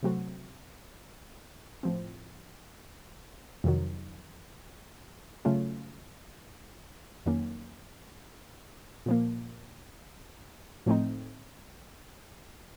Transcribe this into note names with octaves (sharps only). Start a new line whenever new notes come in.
C3 F#3 A3 C4 F#4
A2 F3 C4
F2 C3 D#3 F#3
C#3 F#3 A3 C#4 F4
F2 D#3 F#3 A#3 C#4
A#2 F3 A#3
A2 F3 A3 C4 D#4